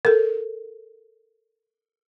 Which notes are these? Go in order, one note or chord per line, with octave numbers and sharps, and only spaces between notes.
A4 A#4